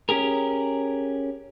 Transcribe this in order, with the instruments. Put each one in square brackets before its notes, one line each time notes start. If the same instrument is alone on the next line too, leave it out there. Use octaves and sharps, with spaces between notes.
[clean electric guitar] C#4 G4 G#4 A#4